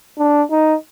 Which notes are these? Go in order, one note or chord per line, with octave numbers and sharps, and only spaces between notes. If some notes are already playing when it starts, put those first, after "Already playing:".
D4
D#4